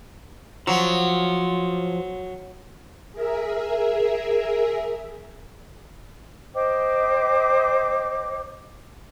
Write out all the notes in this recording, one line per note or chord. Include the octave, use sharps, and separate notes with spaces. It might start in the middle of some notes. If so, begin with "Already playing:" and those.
F3 F#3
G#4 A#4 E5
C5 D#5 G5 D6